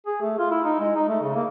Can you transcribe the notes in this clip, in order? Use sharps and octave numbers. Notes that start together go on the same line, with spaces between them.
G#4
A3
F4
E4
D#4
G#3
D#4
A3
C#3
A#3